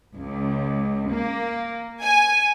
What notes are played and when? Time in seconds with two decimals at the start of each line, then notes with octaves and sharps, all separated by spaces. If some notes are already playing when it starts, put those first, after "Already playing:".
0.14 C#2
1.11 A#3
2.02 G#5